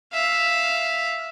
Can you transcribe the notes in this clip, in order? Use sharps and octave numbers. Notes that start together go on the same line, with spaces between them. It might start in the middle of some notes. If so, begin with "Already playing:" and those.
E5 F5